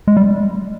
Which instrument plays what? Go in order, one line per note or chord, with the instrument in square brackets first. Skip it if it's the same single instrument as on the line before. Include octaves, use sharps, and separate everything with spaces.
[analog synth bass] G#3
G3